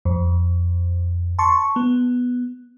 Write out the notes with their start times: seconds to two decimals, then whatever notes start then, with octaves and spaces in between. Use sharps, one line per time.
0.05 F2
1.39 A5 C6 C#6
1.76 B3